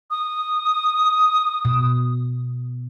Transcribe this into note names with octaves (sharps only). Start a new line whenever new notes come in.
D#6
B2